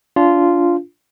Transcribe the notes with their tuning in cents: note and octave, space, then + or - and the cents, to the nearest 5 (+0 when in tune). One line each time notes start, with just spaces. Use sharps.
D4 -25 F4 -10